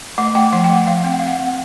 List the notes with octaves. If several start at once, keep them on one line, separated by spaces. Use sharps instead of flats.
A3 F#5
A3 G5
F3 F#5
G5
A3
F#5
F3 F5
C4 G5
F#5
F5
C4 F#5
C4